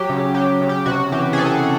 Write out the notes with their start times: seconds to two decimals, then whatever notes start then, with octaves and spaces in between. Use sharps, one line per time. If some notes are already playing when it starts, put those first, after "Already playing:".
Already playing: F#3 G4
0.10 C#3
0.34 F#3 G4
0.61 C#3
0.69 G4
0.86 C3 F#4
1.12 E3 G4
1.33 G#4
1.37 C3 A4